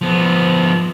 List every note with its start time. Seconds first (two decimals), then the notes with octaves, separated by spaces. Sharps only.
0.01 F3 B3